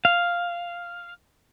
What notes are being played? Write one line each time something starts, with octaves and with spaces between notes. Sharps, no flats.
F5